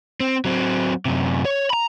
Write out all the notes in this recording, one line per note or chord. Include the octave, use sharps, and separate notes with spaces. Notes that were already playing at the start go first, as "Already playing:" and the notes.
C4
F#3 C4
F#2 C3
C#5
A#5 B5